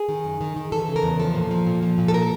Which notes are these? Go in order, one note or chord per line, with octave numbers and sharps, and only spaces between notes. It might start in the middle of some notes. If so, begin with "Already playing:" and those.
Already playing: G#4
D#3
F#2
D#3
D#3
E3 A4
C#3
A#4
E2
F3 A4
A#2
F3
A#2
F3
A#2
A4
A#4